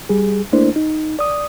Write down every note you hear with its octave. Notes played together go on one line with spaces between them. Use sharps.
G3 G#4
A3 A#3 D4 E4 C5
D#4
D5 D#6